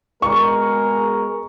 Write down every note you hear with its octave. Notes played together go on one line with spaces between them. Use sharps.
B2 G#3 A#4 C#6